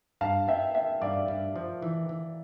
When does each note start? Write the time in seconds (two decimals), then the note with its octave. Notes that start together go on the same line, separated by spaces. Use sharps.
0.21 G2 F5 A5
0.48 B3 E5 G5
0.75 B3 E5 G5
1.02 G2 D5 F5
1.28 G2
1.56 F3
1.82 E3
2.09 E3